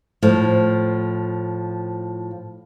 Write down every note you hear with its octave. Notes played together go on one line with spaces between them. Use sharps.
A2 F3